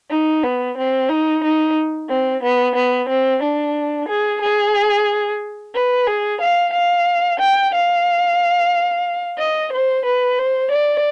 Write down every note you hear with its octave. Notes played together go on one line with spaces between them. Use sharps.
D#4
B3
C4
D#4
D#4
C4
B3
B3
C4
D4
G#4
G#4
B4
G#4
F5
F5
G5
F5
D#5
C5
B4
C5
D5